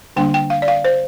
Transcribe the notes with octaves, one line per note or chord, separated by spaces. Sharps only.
D3 G3 A#3 D4 G5
G5
F5
D5
F5
C5